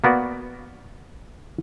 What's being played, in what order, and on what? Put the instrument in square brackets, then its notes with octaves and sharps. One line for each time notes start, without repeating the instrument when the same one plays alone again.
[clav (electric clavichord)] A#3 B3 F#4 D5